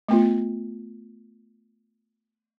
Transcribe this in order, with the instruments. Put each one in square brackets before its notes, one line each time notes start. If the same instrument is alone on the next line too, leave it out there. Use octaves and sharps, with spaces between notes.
[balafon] A3 B3 F4